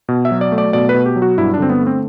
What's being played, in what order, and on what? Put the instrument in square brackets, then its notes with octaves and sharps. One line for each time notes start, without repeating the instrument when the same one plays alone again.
[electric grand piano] B2
E5
F#3
D5
A3
D5
B2 D5
B4
B2
G4
F#3
F#4
G2 E4
D4
D3 C4
B3
A3
C4